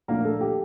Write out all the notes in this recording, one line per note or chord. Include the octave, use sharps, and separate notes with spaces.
A#2 F3 A3 A#3 D4 A#4
A4
G4